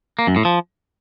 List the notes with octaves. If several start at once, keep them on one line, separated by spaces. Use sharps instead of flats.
A#3
F#2
A2
F3